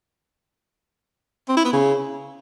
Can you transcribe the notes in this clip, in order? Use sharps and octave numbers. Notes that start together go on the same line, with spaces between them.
C4
E4
B3
C#3